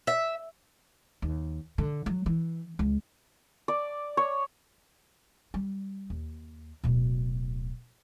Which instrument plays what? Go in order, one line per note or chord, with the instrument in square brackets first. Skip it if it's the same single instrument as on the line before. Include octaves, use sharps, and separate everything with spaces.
[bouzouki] E5
[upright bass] D#2
D3
F#3
E3
C#2
[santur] D5
C#5
[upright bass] G3
D#2
D1 B2